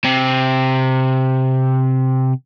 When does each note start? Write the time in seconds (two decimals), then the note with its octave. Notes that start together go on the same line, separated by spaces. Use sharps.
0.04 C3 C4